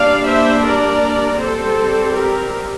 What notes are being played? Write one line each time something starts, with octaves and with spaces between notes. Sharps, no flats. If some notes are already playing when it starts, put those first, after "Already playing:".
Already playing: G3 A#3 D4 D5 F5
C5 E5
A#4 D5
G3 C4 A4 C5
G4 A#4